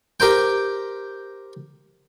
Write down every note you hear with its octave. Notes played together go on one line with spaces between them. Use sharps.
G4 A#4 C5 G5